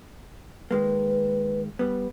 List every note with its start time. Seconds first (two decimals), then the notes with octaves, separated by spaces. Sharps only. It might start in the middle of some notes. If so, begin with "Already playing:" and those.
0.71 D#3 G#3 A#3 B4
1.79 G3 B3